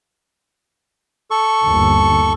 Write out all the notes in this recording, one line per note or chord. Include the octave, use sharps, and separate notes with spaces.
A4 C#6
G1 D#2